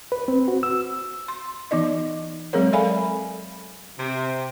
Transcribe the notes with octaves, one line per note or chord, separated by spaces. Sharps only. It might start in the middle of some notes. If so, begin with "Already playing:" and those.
B4
C4
F#4
E6
C6
E3 B3 D#4 D5 D#5
F#3 G#3 C4 G#4 A#4 C#5
A4 D5 E5 F5 G#5 B5
C3